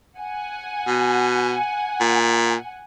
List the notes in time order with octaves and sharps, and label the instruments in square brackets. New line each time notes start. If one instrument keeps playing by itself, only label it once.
[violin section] F#5 G#5
[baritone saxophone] B2
A#2